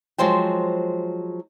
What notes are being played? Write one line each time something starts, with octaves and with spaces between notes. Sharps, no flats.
F3 F#3 G#3 C5 G5